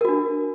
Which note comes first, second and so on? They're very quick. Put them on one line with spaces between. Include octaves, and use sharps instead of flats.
A#4 F#4 D4